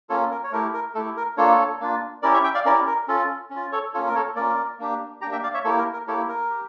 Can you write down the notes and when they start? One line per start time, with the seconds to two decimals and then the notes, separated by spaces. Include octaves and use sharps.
0.09 A#3 C#4 F4 A4 C#5
0.31 A#4
0.44 C#5
0.52 A3 E4 G4 A#4
0.74 A#4
0.95 A3 E4 G4 A4
1.17 A#4
1.37 A#3 D4 F4 A4 C#5
1.81 A#3 D4 F4
2.22 C#4 E4 G4 A#4 D5
2.34 C#5 E5
2.44 E5 G5
2.54 D5 F5
2.65 C#4 E4 G4 A#4 D5
2.87 A#4
3.08 C#4 F4 A4
3.50 C#4
3.56 F4
3.72 A4 C#5
3.94 A#3 C#4 F4 A4 C#5
4.08 A#4
4.15 A4 C#5
4.36 A#3 C#4 F4 A#4 D5
4.79 A#3 D4 G4
5.21 A#3 D4 G4 G5 A#5
5.32 E5 G5
5.43 D5 F5
5.54 C#5 E5
5.64 A#3 E4 G4 A4 C#5
5.79 A#4
5.93 A#4
6.08 A#3 E4 G4 A4 C#5
6.29 A#4
6.50 G4